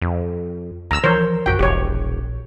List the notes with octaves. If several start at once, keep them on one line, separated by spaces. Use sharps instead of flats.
F2
D2 A#5 E6
E3 F3 A#4 C5 C#5
A#1 F#2 D3 F#4 G5
E1 A#1 G4 C#5